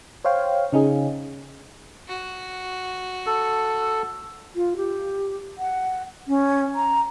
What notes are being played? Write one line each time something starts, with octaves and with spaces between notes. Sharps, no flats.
C5 C#5 F5 G5
C#3 C#4 D#4 G#4
F#4
A4
F4
G4
F#5
C#4
A#5